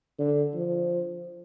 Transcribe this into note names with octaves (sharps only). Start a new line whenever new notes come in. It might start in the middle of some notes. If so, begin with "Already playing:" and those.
D3
F3